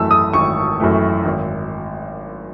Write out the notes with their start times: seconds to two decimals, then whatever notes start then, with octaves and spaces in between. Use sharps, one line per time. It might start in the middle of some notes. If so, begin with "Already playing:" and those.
Already playing: G#1 F#2 E3 A3 A5 E6
0.11 D#6
0.33 G#1 C#6
0.80 F#2 E3 A3
1.25 G#1